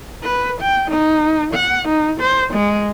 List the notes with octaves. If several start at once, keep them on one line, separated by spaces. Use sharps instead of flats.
B4
G5
D#4
F#5
D#4
C5
G#3